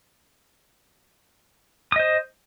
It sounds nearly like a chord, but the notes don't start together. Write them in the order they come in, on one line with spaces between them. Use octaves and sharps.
D#6 D#5 C5